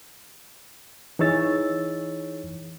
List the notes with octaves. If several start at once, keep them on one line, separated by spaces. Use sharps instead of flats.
E3 D#4 G#4 C#5 E6 A6